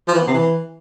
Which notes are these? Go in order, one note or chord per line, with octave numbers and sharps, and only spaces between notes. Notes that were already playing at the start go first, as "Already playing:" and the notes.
F3
E3
B3
C3
E3